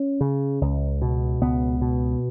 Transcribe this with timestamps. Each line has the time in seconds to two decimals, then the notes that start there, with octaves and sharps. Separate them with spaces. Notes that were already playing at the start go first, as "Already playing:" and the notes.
Already playing: C#4
0.21 C#3
0.61 C#2
1.02 B2
1.41 C#2 B3
1.81 B2